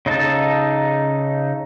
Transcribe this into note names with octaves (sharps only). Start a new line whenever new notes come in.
C#3 D#4 A4 A5